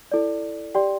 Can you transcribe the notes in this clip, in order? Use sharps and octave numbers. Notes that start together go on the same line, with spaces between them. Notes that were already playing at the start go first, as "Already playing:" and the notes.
E4 A4 D5
G4 D5 G5 C6